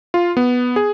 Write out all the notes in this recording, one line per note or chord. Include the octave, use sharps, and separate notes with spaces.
F4
B3
G#4